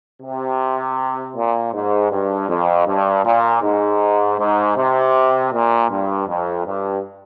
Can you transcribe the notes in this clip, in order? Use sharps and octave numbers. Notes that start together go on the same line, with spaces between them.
C3
A#2
G#2
G2
F2
G2
A#2
G#2
G#2
C3
A#2
G2
F2
G2